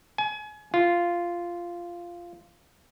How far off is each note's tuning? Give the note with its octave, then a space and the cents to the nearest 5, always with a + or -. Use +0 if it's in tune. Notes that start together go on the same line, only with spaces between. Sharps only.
G#5 +30
F4 -10